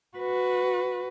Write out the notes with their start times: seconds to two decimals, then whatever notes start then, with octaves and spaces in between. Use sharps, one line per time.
0.17 F#4 B4